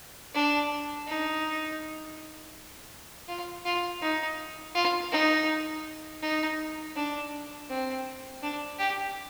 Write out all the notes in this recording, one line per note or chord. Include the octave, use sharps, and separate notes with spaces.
D4
D#4
F4
F4
D#4
F4
D#4
D#4
D4
C4
D4
G4